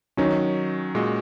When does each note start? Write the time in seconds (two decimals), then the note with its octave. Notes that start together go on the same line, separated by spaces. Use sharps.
0.17 D#3 F#3 C#4 D#4
0.95 A#2 G#3 F#4 D#5